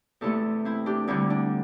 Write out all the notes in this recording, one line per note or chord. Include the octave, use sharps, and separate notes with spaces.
E2 C3 A3 E4 A4
C4 E4
D4 G4
D2 D3 G3 C4 E4
D4